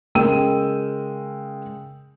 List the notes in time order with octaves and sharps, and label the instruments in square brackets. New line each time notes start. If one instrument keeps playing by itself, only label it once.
[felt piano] C#3 G#3 A#4 G5 E6 D#7